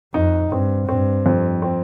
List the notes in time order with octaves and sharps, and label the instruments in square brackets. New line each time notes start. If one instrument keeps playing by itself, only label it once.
[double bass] F2 [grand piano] D#4
[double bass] G2 [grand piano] C4
[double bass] G2 [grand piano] C4
[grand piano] F2
C4